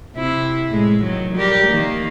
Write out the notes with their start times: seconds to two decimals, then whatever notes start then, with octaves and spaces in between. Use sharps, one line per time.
0.16 C3 E4
0.69 A2 G#3
1.03 D#3 F#3
1.35 G3 G4 A#4
1.66 D#3 A#3